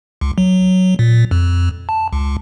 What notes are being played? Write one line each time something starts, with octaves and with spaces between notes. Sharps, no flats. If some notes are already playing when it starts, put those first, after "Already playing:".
C#2
F#3
A#2
F2
A5
C#2